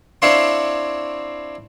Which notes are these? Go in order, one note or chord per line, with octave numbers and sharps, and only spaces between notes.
C4 D4 E4 C#5 F5 C6